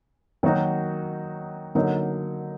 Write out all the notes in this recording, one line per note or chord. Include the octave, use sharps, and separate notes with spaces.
D#3 F#3 A#3 D#4 F#4
D3 F#3 A#3 D#4